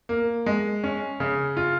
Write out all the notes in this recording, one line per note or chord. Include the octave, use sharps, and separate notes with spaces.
A#3
G#3
C#4
C#3
F4